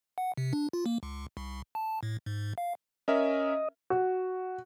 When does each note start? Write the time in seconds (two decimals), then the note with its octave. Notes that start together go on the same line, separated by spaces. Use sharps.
0.18 F#5
0.37 C3
0.53 D4
0.73 F4
0.86 A#3
1.03 C#2
1.37 C2
1.75 A5
2.03 A2
2.26 G#2
2.58 F5
3.08 C#4 A#4 D#5 E5
3.90 F#4